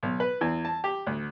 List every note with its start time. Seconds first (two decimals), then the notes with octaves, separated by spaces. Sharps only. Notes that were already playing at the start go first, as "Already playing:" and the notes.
0.03 B1
0.20 B4
0.41 E2
0.65 A5
0.84 G4
1.07 D2